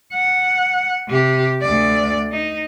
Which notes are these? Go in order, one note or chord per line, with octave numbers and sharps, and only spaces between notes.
F#5
C3 G4
D2 D5
D#4